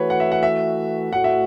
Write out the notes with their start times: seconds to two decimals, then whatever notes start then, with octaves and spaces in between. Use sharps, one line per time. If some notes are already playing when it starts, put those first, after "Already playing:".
Already playing: E3 A3 F#4 B4 C#5
0.10 F#5
0.20 E5
0.32 F#5
0.43 E5
1.13 A2 A3 F#4 F#5
1.24 E5